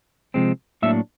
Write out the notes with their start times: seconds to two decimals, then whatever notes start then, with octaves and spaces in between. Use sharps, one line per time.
0.34 C3 F3 G#3 C4
0.82 A2 F#3 A#3 D4 E5